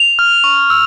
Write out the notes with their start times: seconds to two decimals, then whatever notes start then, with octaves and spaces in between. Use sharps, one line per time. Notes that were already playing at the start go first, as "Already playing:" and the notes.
Already playing: F7
0.19 F6
0.44 C#6
0.70 E6